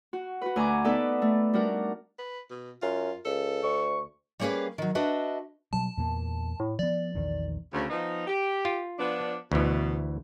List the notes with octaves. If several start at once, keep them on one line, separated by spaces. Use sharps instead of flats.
F#4
F#4 B4
D2 G#5 A#5 C#6 D6
B3 D#4 A4 B4 D5
A3
G3 D4 F#4 A#4
B4
B2
F#2 F4
C#2 A4
D2 C#6
G3 A#3 C#4 G#4 B4 F5
D#3 F#3
D4 F#4 B4 D#5 E5
B2 F#3 G3 A5
E2 A#2 A#3
A2
F3 B3 D5
A#1 E2 D#3
D2 C#3
F3 B3 D#4
G4
F4
F3 B3 D4
D2 B2 E3